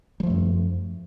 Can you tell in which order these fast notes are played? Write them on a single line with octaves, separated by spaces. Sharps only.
G3 F3 A3 F#2